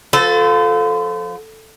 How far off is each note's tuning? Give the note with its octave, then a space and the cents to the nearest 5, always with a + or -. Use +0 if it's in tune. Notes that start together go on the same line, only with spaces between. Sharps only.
F3 +20 A4 -5 C5 -45